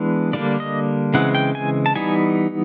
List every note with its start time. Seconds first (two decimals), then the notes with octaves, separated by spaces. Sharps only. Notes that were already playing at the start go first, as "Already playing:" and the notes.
Already playing: E3 G#3 B3 D4
0.33 D3 G3 A#3 D4 D5
0.60 D#5
1.14 C#3 E3 G#3 C4 F#5
1.35 G5
1.55 G#5
1.86 A5
1.95 E3 G3 B3 D#4 G#5